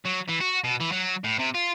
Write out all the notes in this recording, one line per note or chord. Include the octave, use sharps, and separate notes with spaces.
F#3
E3
F#4
B2
E3
F#3
A2
C3
F4